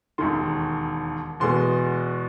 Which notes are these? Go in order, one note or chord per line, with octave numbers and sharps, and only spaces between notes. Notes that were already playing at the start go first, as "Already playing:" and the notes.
E1 D#2 D#3 C6
E2 B2 G#3 B3 C6